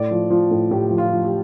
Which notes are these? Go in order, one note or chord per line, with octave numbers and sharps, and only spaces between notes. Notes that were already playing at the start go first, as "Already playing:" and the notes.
Already playing: A2 D5
F3
F3
A2
A2 G4
F3
F4
F3
G4